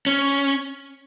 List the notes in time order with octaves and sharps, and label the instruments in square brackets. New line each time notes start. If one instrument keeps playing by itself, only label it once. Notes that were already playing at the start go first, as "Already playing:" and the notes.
[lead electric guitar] C#4